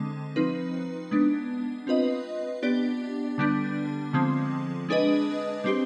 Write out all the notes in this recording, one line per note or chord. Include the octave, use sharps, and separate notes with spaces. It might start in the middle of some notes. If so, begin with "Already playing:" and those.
Already playing: D3 G#3 C4
F3 C4 D#4 B4
G#3 B3 D4
C4 F4 B4 D#5
B3 D4 G4 D5
D3 G3 B3 D4
D3 F3 G#3 C4
G#3 D4 G#4 B4 D#5
G3 C4 G4